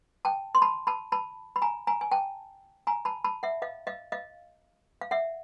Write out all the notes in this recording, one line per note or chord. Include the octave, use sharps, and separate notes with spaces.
G5 A5
C6
A5 B5
A5 B5
A5 B5
B5
G#5 A#5
G#5 A#5
G#5
G5 A5
G#5 A#5
A5 B5
A5 B5
E5 F#5
D#5 F5
D#5 F5
D#5 F5
F5
E5 F#5